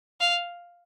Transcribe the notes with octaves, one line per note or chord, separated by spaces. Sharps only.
F5